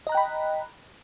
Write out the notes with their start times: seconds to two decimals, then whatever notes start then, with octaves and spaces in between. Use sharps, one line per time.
0.07 D#5
0.09 A#5
0.12 F#6
0.15 G5
0.17 B5